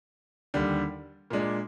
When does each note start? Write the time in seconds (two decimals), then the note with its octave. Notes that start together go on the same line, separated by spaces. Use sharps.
0.54 D#2 D3 G3
1.30 A#2 G#3 D4